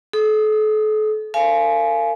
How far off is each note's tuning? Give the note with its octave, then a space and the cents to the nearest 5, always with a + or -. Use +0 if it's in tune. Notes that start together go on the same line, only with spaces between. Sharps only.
A4 -40 D#6 -10
A#4 -40 F5 -30 G#5 +25